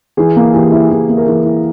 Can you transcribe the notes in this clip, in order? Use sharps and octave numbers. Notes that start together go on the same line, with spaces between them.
E3 G#4
A#3
E3 G4
E4
E3 G#4
A#3
A#4
E3 G#4
E4